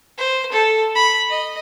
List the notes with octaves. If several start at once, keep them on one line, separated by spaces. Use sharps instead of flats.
C5
A4
B5
D#5